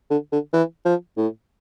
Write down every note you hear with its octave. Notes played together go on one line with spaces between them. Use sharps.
D3
D3
E3
F3
A2